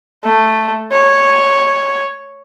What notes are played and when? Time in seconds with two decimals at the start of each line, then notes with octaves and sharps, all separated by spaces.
0.25 A3
0.92 C#5